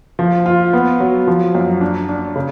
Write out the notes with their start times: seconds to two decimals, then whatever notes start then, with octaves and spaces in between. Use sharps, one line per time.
0.19 F3
0.46 F4
0.73 B3
1.00 F#3
1.27 F3
1.55 F#2
1.81 D4
2.09 D4
2.36 C#3